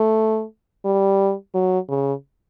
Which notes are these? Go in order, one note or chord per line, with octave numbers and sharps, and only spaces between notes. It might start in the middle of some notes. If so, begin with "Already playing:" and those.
Already playing: A3
G3
F#3
C#3